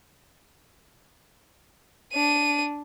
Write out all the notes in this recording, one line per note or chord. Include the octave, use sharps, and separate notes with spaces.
D4 D#7